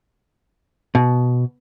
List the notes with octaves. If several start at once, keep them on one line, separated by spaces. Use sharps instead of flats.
B2